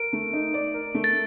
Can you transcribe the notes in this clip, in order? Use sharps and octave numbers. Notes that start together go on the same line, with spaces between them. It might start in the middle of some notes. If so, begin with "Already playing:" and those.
Already playing: A#4 D7
A3
D#4
D5
A#4
A3
A6